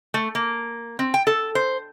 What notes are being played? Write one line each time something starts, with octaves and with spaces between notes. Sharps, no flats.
A3
A#3
C4
G5
A4
C5